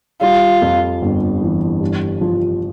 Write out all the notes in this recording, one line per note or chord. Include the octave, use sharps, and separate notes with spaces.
G3 F4
F2
G1
E3
G2
F3